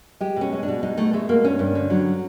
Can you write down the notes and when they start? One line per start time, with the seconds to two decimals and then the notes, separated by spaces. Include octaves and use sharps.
0.21 G#3 G4
0.36 B2 C#4
0.52 G#3
0.63 D4
0.68 B2
0.83 G#3 D#4
0.98 B2 A3
1.13 G#3 A3
1.29 B2 A#3
1.44 G2 C#4
1.59 G2
1.75 D3
1.90 F#3